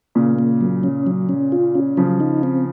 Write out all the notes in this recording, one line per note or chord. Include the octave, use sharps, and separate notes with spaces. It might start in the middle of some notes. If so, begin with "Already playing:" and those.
A#2 C#3 A#3
A#3
F#3
C#4
F#3
C#4
F4
C#4
C#3 F3 F#3
D#4
C4